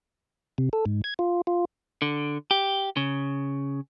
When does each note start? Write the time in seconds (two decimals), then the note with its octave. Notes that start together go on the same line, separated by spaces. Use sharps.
0.58 C3
0.73 A4
0.86 G#2
1.04 G#6
1.19 F4
1.47 F4
2.02 D3
2.51 G4
2.97 C#3